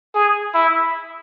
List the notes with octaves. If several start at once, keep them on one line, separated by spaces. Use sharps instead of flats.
G#4
E4